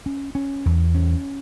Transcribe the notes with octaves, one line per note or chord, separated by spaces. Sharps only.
C#4
C#4
E2
C#4